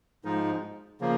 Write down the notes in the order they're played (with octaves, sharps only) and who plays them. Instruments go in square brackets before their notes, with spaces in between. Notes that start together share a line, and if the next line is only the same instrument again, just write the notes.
[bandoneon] G#2 F3 G#3 D#4
C#3 F3 A#3